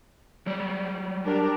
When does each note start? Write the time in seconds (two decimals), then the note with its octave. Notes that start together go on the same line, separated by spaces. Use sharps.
0.46 F#3 G3 D5
1.25 D4 G4 A#4